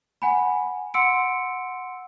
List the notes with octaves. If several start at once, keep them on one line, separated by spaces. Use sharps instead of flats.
F#5 G#5 B5
F#5 C6 E6 C#7 D7